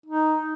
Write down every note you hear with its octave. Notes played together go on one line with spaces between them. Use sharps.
D#4